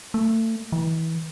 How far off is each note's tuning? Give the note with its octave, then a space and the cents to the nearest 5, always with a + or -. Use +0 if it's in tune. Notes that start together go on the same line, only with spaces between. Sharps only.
A3 +30
E3 -25